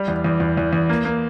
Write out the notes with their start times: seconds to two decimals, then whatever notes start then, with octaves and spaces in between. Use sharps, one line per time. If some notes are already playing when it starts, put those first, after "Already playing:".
Already playing: G3
0.08 E2
0.24 E2
0.40 E2
0.57 E2
0.73 E2
0.89 A#3
1.05 A#3